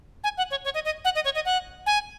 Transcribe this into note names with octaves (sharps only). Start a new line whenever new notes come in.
G#5
F#5
C#5
C#5
D#5
D#5
F#5
D#5
C#5
D#5
F#5
G#5